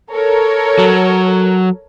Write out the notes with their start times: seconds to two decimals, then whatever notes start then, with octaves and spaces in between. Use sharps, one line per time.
0.12 A4 A#4 C#5
0.79 F#3